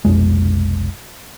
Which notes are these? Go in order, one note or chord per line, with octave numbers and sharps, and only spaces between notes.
F1 B1 F2 G#3